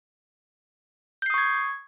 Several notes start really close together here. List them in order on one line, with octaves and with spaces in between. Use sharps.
G6 C7 D#6 C#6 G#6